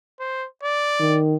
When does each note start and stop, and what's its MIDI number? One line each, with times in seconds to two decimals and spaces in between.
0.20 0.47 72
0.64 1.20 74
1.00 1.36 51